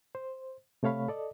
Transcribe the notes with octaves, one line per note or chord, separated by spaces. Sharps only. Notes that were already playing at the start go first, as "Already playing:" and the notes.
C5
C3 A3 C#5 F5 B5
A4 D5 D#5